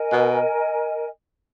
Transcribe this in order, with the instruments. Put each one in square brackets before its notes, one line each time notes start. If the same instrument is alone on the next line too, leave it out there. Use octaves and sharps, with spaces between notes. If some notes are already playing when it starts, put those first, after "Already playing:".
Already playing: [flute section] A#4 D#5 G#5
[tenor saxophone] B2